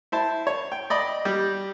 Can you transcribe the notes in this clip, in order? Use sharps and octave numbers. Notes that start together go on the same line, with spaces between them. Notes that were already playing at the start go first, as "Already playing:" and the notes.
E4 C5 A5
C#5
G5
D5 D#5 B5
G3